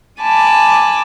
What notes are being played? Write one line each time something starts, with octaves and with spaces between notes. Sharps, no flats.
G#5 A5 B5 D6